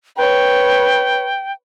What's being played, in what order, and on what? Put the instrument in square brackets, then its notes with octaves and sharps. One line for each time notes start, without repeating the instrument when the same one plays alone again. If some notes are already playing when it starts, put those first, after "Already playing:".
[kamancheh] B4 C#5 [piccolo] G5